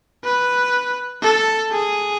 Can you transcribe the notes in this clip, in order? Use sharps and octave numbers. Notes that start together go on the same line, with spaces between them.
B4
A4
G#4